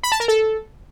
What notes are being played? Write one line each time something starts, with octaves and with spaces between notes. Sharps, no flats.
B5
A5
A#4
A4